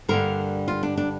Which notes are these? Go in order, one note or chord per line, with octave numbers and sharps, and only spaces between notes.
G2 D3 G3 A#3 A#4
F4
D4
D4